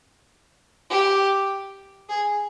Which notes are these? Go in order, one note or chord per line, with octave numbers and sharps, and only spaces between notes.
G4
G#4